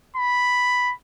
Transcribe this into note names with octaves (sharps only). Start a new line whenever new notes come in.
B5